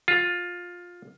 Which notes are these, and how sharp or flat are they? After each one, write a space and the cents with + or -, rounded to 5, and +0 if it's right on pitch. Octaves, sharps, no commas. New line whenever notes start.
F4 +15